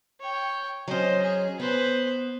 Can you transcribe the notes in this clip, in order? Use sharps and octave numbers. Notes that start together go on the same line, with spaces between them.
C#5 G5
F#3 C#4 C5 D#5
G#4
B3 B4 C5